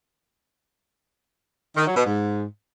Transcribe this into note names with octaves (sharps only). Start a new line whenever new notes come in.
D#3
F#3
B2
G#2